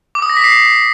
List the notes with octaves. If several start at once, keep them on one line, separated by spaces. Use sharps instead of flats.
D6
D#6
A#6
B6
C7